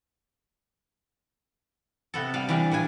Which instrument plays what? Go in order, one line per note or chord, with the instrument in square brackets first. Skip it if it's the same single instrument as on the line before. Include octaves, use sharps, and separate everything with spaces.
[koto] C3 B3 A4
G3 F5
E3 F3 G3 D4
A#2 E3 D4 G#5